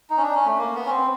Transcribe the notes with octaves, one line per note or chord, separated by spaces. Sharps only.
D#4
C#4
D4
C#4
A3
A#3
B3
C#4
C4